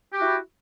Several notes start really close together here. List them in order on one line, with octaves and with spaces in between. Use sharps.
G4 F#4 E4